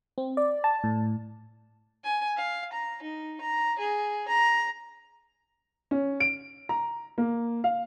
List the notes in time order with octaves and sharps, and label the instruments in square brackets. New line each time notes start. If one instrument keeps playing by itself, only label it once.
[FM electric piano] C4
D5
A5
A2
[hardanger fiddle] G#5
F5
A#5
D#4
A#5
G#4
A#5
[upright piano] C#4
D7
A#5
A#3
F5